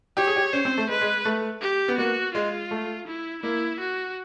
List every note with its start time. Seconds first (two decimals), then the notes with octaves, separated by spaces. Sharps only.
0.17 G4 C#5
0.27 G#4
0.36 G4
0.53 C#4 C5
0.65 C4
0.77 A3
0.89 G#3 B4
1.01 G#3
1.25 A3
1.62 G4
1.88 B3
1.98 A#3 F#4
2.34 G#3 F4
2.71 A3
3.07 E4
3.43 A#3 E4
3.80 F#4